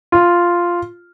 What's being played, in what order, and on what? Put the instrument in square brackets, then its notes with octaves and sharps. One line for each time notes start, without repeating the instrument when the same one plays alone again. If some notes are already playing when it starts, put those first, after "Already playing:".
[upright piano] F4